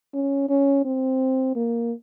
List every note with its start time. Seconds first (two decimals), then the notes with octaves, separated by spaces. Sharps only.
0.14 C#4
0.49 C#4
0.84 C4
1.55 A#3